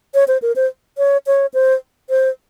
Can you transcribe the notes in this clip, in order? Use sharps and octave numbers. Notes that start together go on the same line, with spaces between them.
C#5
C5
A#4
C5
C#5
C#5
C5
C5